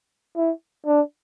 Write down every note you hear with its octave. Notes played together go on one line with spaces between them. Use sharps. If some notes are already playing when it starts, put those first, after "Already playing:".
E4
D4